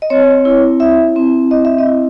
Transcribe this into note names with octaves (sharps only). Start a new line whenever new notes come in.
D#5
C4 C#5
E4
E4 E5
C4
C4 D#5
E5
D#5
E4